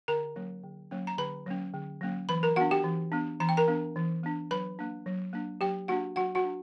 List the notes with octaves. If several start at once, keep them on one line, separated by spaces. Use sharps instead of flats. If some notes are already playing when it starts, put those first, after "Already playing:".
D3 A#4 A#5
F#3 A#3 C#4
D3
F#3 A#3 C#4
A#5
D3 B4 B5
F#3 A#3 C#4
D3
F#3 A#3 C#4
E3 B4 B5
A#4 A#5
B3 D4 F#4 F#5
G4 G5
E3
B3 D4
E3 A#5
G5
A#4 A#5
B3 D4
E3
B3 D4
F#3 B4 B5
A#3 D4
F#3
A#3 D4
F#3 G4 G5
A#3 D4 F#4 F#5
F#3 F#4 F#5
F#4 F#5
D4